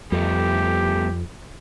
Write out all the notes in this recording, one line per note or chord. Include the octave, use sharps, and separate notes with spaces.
F2 G3 A3 B3 G4